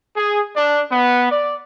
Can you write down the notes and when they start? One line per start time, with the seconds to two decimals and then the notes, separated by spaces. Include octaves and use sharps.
0.17 G#4
0.56 D4
0.92 B3
1.31 D5